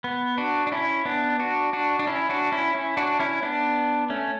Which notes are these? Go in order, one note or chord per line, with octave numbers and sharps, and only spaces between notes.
B3
D4 F#4
D4
C#4 E4
B3 D4
D4 F#4
D4 F#4
D4
C#4 E4
D4 F#4
C#4 E4
C#4 E4
D4 F#4
C#4 E4
B3 D4
A3 C#4